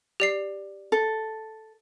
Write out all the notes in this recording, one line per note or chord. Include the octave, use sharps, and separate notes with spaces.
G4 D5 C7
A4